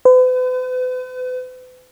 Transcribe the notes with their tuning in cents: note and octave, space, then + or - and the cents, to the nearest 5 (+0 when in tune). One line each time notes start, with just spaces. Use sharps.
B4 +45